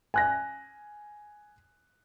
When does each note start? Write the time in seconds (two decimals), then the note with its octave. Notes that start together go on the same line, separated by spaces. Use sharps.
0.14 G#5 F#6 A#6